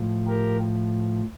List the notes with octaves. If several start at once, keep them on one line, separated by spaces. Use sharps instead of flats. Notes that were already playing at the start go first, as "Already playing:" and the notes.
Already playing: A2 F3
G4 A#4